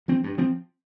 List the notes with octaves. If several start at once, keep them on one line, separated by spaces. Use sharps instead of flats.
F3 C4
G2
F3 C4